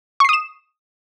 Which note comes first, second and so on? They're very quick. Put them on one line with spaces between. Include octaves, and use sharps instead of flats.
C#6 C7 D#6 E7